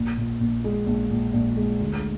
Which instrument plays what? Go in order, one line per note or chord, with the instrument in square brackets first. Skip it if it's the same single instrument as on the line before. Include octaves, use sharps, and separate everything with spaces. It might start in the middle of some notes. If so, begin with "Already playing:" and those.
Already playing: [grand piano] A#1
A#2
A#1
G#3
A#1
A#2
A#1
G#3
D2